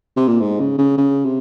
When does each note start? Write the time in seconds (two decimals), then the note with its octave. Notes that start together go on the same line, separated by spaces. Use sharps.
0.17 C3
0.28 A#2
0.41 G#2
0.60 C#3
0.78 C#3
0.98 C#3
1.25 C3